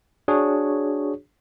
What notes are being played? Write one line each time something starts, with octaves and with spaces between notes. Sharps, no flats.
D4 F#4 G#4 C#5